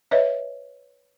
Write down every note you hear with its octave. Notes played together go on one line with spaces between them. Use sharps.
B4 C#5 D#5 E5